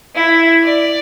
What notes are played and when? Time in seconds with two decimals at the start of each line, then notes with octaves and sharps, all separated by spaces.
0.15 E4
0.64 D5